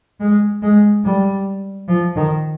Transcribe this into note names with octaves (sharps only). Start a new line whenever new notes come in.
G#3
G#3
G3
F3
D#3